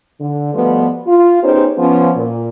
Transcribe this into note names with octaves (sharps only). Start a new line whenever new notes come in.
D3
B2 F3 G3 A3 B3
F4
B3 C#4 D#4 G4 G#4 C5
F3 B3 C#4
A#2